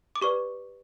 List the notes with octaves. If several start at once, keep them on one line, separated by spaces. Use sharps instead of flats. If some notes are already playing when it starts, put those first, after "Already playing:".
D6
G4 B4 D5 C#6